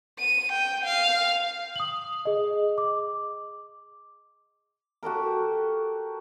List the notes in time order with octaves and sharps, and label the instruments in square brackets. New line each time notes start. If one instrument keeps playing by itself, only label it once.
[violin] D#7
G5
F5
[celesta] D#6 F#7
G#4 D#5
D6
[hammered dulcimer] F#4 G4 A4 A#4